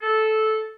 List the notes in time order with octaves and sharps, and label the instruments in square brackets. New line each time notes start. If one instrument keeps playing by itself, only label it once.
[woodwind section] A4